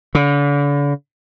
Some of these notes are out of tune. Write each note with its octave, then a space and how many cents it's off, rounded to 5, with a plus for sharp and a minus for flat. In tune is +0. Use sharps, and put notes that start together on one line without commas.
D3 -40